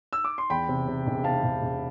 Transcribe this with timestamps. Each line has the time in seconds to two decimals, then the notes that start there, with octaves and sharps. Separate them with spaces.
0.13 E6
0.25 D6
0.38 C6
0.50 E2 G5 B5
0.68 C3
0.88 C3
1.06 E1
1.24 C3 F5 A5
1.43 E1
1.62 E1